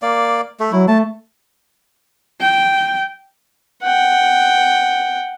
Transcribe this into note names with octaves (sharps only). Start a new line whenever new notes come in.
A#3 D5
A3
F#3 E4
A3 A5
G5
F#5 G5